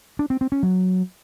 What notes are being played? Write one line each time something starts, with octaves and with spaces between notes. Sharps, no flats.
D4
C4
C4
C#4
F#3